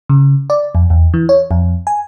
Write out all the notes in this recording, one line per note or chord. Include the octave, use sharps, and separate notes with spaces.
C#3
D5
F2
E2
E3
C#5
F2
G#5